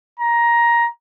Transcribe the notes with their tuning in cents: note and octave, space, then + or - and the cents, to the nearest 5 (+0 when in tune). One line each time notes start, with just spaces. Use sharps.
A#5 +15